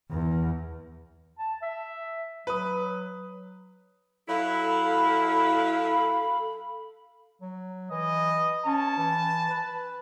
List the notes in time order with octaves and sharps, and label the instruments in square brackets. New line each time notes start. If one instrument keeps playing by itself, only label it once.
[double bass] E2
[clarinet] A5
E5
[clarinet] F#3 [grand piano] B4 D#6
[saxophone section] F#3 E4 [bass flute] A4 [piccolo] F5 [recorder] B5
[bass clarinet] F#3
[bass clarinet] E3 [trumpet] D#5
[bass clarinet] C#4 [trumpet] A5
[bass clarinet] E3
B4